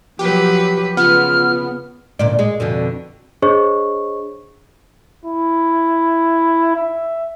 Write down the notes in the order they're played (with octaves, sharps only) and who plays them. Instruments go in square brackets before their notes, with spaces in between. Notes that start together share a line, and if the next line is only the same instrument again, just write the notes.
[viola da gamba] F3 F#3 B4 [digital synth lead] G4
[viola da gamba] C#3 [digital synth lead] B3 [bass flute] F4 [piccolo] F6
[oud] D2 A#2 D5
G#3
F2 B2 D3
[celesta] D4 G#4 C5 C#5 D#5 C#6
[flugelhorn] E4
E5